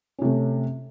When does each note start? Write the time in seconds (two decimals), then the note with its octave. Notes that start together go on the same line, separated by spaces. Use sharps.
0.18 C#4
0.22 C3
0.25 A3